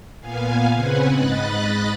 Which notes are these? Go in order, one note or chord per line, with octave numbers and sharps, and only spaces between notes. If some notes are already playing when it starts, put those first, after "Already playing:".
A#2 B3 F5 G#5
C#3 C4 B4 F#5 G#5
G#2 D#5 B5 F#6 A6